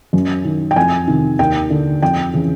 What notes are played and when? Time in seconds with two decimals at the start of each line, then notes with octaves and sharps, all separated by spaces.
0.13 F#2
0.45 D#3
0.71 G5
0.76 F2 G#5
1.08 C3 D#3
1.39 D#2 G5
1.70 D3
2.02 F2 G5
2.33 C#3 E3